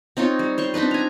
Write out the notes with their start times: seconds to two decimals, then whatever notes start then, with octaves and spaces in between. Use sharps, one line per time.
0.17 C4 D#4 F4 C#5
0.39 G3
0.58 C5 C#5 C#6
0.74 C4 D4 D#4 B4
0.91 G#5 A#5